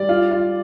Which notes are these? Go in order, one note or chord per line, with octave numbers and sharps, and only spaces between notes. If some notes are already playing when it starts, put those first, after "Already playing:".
Already playing: G3 D5
F4
F4